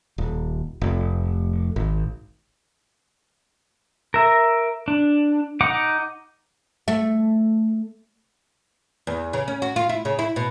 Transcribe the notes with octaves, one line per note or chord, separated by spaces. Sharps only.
D#1
F1
G#1
A#4 E5
D4
D#4 F#5 D6
A3
E2
C#3
C#4
F#4
F4
E4
C#3
E4
B2